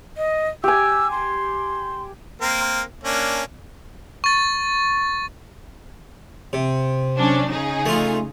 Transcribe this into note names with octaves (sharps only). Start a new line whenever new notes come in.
D#5
G4 G#5 E6
C6
A#3 C4 A#4
A#3 C#4 D4
C#6 A6
C3
F#3 C#4 D4
C#3 D#4 G#4
A3 F4